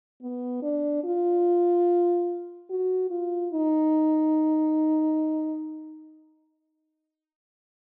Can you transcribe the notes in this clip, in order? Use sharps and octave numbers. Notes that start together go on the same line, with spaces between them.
B3
D4
F4
F#4
F4
D#4